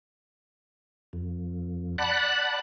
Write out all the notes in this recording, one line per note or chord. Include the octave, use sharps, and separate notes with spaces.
F2
D5 F#5 A5 B5 F#6